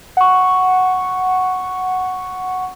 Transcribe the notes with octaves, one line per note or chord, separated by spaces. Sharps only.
F#5 C#6